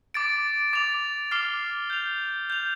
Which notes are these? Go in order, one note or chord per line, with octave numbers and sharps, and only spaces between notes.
D6 A6 D7
D6 A6 D7 F7
D6 F6 C7 G7
G6 F7
G6 F7